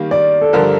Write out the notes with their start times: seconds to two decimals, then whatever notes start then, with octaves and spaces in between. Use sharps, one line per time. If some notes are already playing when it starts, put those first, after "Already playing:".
Already playing: D#3 G3 A#3
0.11 D5
0.41 A4
0.53 G2 D3 F3 A#4